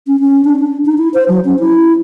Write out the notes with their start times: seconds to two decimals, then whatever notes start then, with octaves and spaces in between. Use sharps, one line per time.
0.07 C#4
0.20 C#4
0.45 D4
0.59 D4
0.85 D#4
0.98 E4
1.14 C5
1.28 F#3
1.45 C#4
1.60 E4